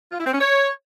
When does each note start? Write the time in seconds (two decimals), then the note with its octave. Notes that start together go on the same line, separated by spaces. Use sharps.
0.12 F4
0.19 E4
0.26 C4
0.33 C#4
0.40 C#5